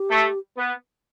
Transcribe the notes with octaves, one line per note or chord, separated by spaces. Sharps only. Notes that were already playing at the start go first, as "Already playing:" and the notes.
Already playing: G4
A3
B3